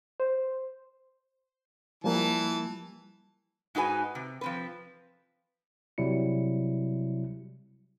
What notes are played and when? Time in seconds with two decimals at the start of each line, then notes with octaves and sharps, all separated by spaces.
0.20 C5
2.04 E3 F3 G3 A#3 A5
3.75 G#2 D#4 F#4 B4 G#5
4.15 C3
4.41 F3 C4 B4
5.98 C3 F#3 G3 E4 C#7